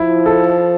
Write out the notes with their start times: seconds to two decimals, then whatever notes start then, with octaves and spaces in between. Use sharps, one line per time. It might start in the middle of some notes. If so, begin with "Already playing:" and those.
Already playing: F3 E4
0.26 A4